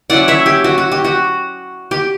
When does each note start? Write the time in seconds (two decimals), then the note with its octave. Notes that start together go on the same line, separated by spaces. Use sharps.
0.10 F#3 C#4 E4 D5 F#5
0.28 C#5 E5
0.46 G4
0.64 F#4
0.78 F#4
0.92 G4
1.04 F#4
1.91 G4